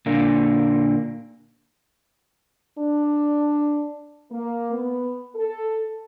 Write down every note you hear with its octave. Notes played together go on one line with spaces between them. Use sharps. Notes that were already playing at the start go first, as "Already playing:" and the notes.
A#2 D3 A#3
D4
A#3
B3
A4